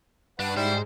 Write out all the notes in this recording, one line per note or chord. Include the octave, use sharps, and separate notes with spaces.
G2 D4 B4 F#5
G#2 G3 E4 C5